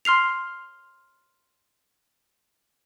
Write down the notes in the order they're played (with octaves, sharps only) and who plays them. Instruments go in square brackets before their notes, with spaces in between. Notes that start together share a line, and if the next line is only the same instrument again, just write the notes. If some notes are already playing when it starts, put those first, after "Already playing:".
[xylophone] C6 F6 C7 F7